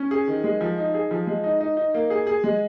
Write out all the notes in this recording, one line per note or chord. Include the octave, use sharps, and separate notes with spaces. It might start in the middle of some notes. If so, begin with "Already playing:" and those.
Already playing: C#4
G#4
D#3
G#3
F3
D#4
G#4
F3
G#3
D#4
D#4
D#4
A#3
G#4
G#4
G#3